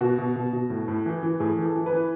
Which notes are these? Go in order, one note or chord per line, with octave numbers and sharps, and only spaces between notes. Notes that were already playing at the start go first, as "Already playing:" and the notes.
B2 F#4
B2
B2
B2
A2
A2
E3
E3
A2 G#4
E3
A4
E3
B4
E3